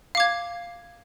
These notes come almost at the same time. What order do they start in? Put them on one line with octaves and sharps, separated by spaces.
F5 D6 G#6